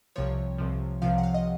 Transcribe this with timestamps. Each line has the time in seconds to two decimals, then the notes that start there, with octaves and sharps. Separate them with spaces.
0.16 C2 C3 F3 C#5
0.58 C2 C3 F3
1.02 C2 C3 F3 F5
1.18 F#5
1.23 F5
1.34 D#5